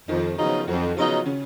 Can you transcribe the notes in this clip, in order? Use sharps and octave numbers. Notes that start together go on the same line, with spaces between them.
F2 D#3 D#4
C#3 F3 F#3 B3 D#4 F4
F2 F#3 F#4
C#3 F3 F#3 B3 D#4 F4
C#3 C#4